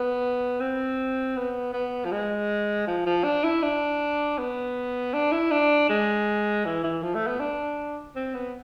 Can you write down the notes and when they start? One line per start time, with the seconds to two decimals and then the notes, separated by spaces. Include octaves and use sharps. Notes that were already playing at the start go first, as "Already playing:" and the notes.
Already playing: B3
0.60 C4
1.37 B3
1.73 B3
2.05 F3
2.12 G#3
2.87 F3
3.06 F3
3.24 D4
3.44 E4
3.63 D4
4.38 B3
5.14 D4
5.32 E4
5.51 D4
5.89 G#3
6.65 E3
6.84 E3
7.03 F3
7.15 A3
7.27 B3
7.40 D4
8.16 C4
8.34 B3